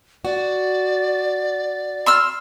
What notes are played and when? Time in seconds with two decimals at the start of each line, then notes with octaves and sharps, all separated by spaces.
0.25 F#4 D5
2.06 C6 E6 F6